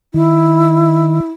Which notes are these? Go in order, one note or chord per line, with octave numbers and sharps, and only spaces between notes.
D#3 E4